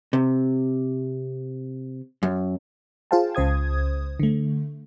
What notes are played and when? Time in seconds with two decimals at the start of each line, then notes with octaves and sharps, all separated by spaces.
0.13 C3
2.23 F#2
3.11 F4 G#4 C5 F5 G5 A5
3.35 C#2 C#3 C5 D#6 G#6
4.20 D3 A3